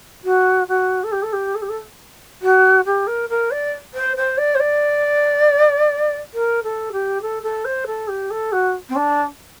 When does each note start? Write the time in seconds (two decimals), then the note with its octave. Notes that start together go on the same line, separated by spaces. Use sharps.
0.24 F#4
0.68 F#4
1.03 A4
1.12 G4
1.23 A4
1.33 G4
1.55 A4
1.62 G4
1.69 A4
2.42 F#4
2.85 G4
3.07 A#4
3.29 A#4
3.51 D5
3.94 C5
4.17 C5
4.38 D5
4.55 C5
4.60 D5
6.34 A#4
6.63 A4
6.92 G4
7.22 A4
7.43 A4
7.65 C5
7.86 A4
8.08 G4
8.30 A4
8.52 F#4
8.89 C4
8.96 D4